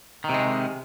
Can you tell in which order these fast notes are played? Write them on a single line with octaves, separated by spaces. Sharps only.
D#3 C3 G#3